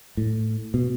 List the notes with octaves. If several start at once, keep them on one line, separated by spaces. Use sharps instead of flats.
A2
B2